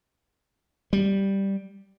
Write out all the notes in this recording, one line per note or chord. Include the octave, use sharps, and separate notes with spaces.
G3